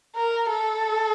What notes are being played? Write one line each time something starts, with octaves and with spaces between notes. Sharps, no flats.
A#4
A4